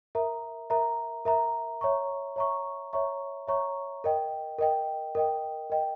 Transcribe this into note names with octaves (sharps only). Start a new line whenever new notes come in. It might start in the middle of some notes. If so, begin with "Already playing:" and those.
A#4 E5 A#5
A#4 E5 A#5
A#4 E5 A#5
C#5 E5 A#5 C#6
C#5 E5 A#5 C#6
C#5 E5 A#5 C#6
C#5 E5 A#5 C#6
A#4 D#5 G5
A#4 D#5 G5
A#4 D#5 G5
A#4 D#5 G5